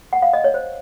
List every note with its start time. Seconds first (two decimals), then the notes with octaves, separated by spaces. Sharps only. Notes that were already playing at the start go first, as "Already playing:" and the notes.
0.13 F#5
0.22 F5
0.33 D#5
0.44 C#5
0.54 C5